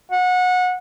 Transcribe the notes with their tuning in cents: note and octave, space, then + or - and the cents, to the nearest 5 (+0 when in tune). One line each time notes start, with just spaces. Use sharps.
F#5 -25